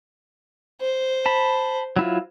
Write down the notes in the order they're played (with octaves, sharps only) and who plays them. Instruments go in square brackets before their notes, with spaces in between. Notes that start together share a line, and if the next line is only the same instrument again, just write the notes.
[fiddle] C5
[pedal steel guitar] A5 B5
F#3 E4 F4